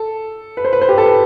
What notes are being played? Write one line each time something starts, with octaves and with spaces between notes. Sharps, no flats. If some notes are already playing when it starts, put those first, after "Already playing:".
Already playing: A4
B4
C5
B4
C5
G4 B4
A4
B4